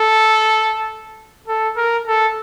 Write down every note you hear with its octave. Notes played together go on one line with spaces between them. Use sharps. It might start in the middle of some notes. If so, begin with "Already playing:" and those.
Already playing: A4
A4
A#4
A4